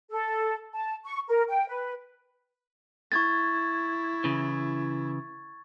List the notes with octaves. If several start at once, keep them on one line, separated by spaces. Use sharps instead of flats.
A4
A5
C#6
A#4
G5
B4
E4 C#6 G#6 A6
C#3 E3